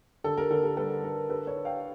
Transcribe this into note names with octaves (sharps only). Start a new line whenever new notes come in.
D3 A4
A#4
D3 A4
A#4
G3 A4 B4
D3 A#4
D4 A4 B4
B4 C#5
D4
F5 G5